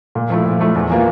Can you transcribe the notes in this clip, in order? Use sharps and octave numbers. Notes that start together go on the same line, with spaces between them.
A#2
F3 A3 E4
A#2
F3 A3 E4
E2
E3 A#3 F4